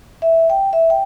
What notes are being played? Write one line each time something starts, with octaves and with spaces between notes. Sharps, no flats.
E5
G5
E5
G5